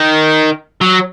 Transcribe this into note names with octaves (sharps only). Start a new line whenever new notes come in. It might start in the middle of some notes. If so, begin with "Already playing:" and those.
Already playing: D#3
F#3